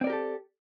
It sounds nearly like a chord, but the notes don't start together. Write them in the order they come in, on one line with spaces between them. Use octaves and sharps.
C4 D5 A#4 G4 A4